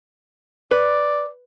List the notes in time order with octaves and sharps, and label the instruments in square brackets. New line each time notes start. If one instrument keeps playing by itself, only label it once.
[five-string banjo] B4 [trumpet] D5